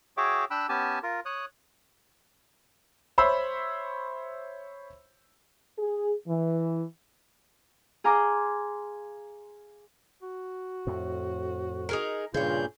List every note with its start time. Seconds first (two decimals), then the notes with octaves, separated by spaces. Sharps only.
0.17 F#4 G#4 C#5 E5 G5 D6
0.51 D4 G5 B5 E6 F#6
0.69 B3 C#4 G4 G#5 A5
1.03 F4 A#4
1.26 C#5 D#6 F#6
3.18 C5 C#5 E5 B5 C6 E6
5.78 G#4
6.27 E3
8.04 G#4 F5 A#5 C6 D6
10.22 F#4
10.87 F2 A2
11.89 D#4 G#4 A#4
12.34 G2 A#2 C#3 F4 G#4 C#5 G6